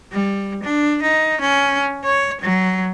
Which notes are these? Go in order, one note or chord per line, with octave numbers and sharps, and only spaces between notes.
G3
D4
D#4
C#4
C#5
F#3